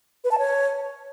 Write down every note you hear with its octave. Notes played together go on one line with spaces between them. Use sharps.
B4
A5
C#5